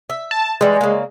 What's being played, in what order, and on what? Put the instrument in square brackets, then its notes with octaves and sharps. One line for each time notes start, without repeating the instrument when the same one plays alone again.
[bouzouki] E5
[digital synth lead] A5
[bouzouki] E3 G3 [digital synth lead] G#3
[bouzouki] C#3 A#3